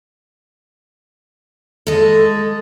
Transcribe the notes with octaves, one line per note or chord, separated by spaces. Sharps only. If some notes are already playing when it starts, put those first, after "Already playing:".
G#3 A4